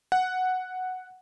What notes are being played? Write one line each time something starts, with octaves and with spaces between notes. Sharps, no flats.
F#5